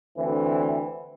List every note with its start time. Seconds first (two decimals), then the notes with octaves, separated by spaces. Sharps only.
0.17 D2 D3 E3 C4